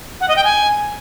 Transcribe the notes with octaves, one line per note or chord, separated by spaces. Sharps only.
F#5
D#5
G5
G#5